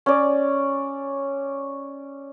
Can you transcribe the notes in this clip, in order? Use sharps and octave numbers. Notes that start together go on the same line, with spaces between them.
C#4 D5